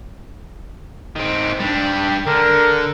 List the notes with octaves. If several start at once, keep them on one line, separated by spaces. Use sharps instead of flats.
D#3 C4
G3 D4
D3 A#4